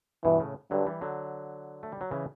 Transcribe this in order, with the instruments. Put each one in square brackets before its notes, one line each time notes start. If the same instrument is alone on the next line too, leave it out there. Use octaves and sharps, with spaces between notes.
[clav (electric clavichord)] G2 B2 [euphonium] E3
[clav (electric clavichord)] A2 C#3
[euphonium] G2 [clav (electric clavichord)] D3 F#3
[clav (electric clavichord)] E3 G3
D3 F#3
A3
G3
F#3
C#3 E3